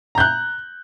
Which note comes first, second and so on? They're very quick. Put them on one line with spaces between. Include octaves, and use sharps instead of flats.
A#5 G6 F#6